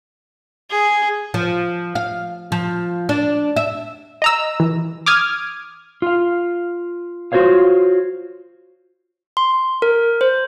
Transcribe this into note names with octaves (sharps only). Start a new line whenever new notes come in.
G#4
F3
F5
F3
D4
E5
D#5 A#5 E6
E3
D6 D#6 F6 G#6
F4 F5
F4 F#4 A4 C5 C#5 F5
C6
A#4
C5